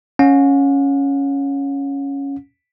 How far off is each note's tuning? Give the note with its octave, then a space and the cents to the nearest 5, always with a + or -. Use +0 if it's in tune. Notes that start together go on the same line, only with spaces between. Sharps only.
C#4 +0 F#5 -45